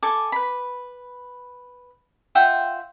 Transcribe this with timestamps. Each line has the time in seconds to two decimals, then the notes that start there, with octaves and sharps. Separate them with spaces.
0.02 A4 G#5 D6
0.32 B4 B5
2.35 F4 E5 F#5 G5